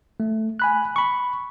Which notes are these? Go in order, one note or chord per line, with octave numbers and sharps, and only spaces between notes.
A3
G#5 B5 F#6
B5 C#6